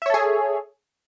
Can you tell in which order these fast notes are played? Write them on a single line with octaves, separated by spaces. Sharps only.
E5 C#5 A4 G#4